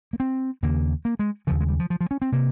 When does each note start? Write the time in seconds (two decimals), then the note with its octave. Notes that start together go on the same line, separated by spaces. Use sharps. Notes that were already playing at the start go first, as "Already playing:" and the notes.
0.13 A#3
0.20 C4
0.62 D#2 C#3 A#3
1.05 A#3
1.19 G#3
1.47 C#3 F3
1.50 D#2
1.60 G#3
1.69 G3
1.80 F3
1.90 F3
2.01 F3
2.11 C#4
2.22 C4
2.32 C3 A#3